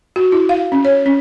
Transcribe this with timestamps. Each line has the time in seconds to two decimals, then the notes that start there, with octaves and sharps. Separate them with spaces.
0.16 F#4
0.32 E4
0.49 F5
0.72 C#4
0.85 C#5
1.06 C#4